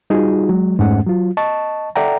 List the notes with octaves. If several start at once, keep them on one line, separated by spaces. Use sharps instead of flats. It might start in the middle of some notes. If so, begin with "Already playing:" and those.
G3 D#4 F4 F#4 G#4
F#3 G#3
F2 G#2 G#3 A3 C#4 F#5
F#3 F4
D#5 A5 C#6
A4 D5 E5 F#5 G5 A#5